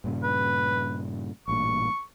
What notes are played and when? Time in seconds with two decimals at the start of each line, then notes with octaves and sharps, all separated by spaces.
0.04 G2 A#2 C#3
0.24 B4
1.48 A1 G2 A#2 C#6